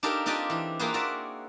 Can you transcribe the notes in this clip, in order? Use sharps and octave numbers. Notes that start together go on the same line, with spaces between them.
D4 D#4 G4 A4 A#4 F5
C4 D4 F4 G4 D5 D#5
E3 D4
A#3 C4 F4 G#4 B4 C5
F#4 A#4 D5 E5